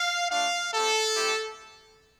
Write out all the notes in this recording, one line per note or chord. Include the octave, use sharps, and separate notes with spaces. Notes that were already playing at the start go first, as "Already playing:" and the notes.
Already playing: F5
A3 D4 F4 F5
C4 G4 A4
A3 C4 E4 G4